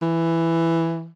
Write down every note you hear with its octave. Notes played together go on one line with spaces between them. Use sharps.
E3